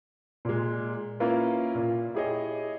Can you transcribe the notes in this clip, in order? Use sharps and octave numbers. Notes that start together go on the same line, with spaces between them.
A#2 G#3
A#3 C#4 E4 F4 B4 F5
A#2 F4
E4 G4 G#4 C#5 D#5